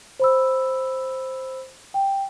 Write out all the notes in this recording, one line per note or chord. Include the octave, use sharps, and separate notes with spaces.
C5 B5 E6
G5